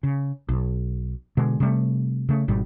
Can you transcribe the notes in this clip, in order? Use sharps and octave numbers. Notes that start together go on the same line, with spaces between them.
C#3
B1
B2 D3 G#3
C3 G3 A3
C#3 A3
G#1 G#2 B2 G3